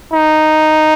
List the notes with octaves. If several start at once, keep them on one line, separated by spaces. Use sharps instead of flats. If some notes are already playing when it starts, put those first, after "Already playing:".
D#4